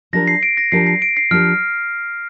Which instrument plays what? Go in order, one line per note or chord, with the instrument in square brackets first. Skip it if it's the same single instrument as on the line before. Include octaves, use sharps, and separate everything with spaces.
[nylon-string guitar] F3 D4 G4 A#4 [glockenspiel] A#6
[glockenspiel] C7
D7
A#6
[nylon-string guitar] F3 D4 G4 A#4 [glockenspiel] C7
[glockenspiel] C7
D7
C7
[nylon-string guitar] F3 D4 G4 A#4 [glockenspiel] F6